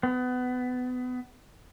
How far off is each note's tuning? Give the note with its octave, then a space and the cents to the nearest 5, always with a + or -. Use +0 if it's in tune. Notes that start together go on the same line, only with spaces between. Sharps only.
B3 +25